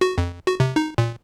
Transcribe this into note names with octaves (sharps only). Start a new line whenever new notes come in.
F#4
F2
F#4
C3
D#4
A#2